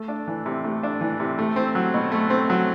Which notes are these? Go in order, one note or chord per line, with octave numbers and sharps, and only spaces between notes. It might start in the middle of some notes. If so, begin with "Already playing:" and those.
Already playing: A3
D4
E3
C3
A3
D4
E3
C3
A3
C4
F#3
B2
A3
C4
F#3